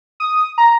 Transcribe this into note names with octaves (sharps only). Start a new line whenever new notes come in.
D#6
A#5